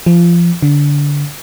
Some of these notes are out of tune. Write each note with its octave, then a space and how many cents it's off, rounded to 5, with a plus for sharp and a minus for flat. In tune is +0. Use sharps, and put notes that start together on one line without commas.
F3 -25
D3 -20